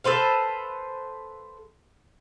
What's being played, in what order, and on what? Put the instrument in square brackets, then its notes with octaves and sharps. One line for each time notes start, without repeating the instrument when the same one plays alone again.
[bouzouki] A4 B4 C5 F5